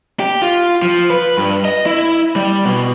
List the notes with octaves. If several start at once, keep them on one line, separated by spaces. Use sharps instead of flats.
G4
F4
F3
B4
G2
D#5
E4
G3
B2